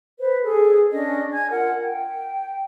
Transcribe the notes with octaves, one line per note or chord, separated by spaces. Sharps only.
B4 C5
G#4 A4
C#4 D4 D#5
G#5 G#6
F4 A#4 F#5
G5